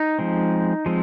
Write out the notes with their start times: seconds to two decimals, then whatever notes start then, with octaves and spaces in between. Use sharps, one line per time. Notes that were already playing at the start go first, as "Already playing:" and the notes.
Already playing: D#4
0.19 F3 G#3 C4
0.86 F3 G#3 C4